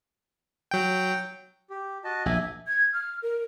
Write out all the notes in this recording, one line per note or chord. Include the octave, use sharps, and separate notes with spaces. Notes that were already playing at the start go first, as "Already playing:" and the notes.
F#3 G5
G4
F#4 D#5 A5
A#1 E5 G#5
G#6
F6
A#4